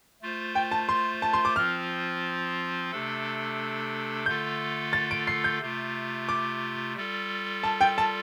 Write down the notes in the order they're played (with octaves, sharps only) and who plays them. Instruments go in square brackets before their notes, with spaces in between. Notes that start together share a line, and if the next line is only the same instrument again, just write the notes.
[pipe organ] A3 F4 C5
[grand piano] G5
A5
C6
A5
C6
D6
[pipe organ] F3 C4 F4 [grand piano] F6
[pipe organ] C3 A3 D4 A4
[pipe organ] D3 A3 F4 A4 [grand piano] G6
[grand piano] A6
D7
C7
G6
[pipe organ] C3 A3 F4
[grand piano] D6
[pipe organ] G3 F4 A4
[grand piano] A5
G5
A5